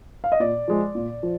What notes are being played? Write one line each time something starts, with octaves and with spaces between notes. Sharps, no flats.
F5
D#5
A#2 D5
F3 G#3
A#2
F3